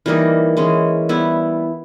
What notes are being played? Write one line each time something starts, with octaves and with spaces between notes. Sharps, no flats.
E3 G3 A#3 D#4
E3 G#3 C#4
G3 B3 E4